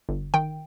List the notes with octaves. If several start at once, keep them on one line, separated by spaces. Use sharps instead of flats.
G1
D#3 G5